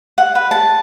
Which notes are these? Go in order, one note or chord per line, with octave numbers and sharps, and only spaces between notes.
F#5
B4
A5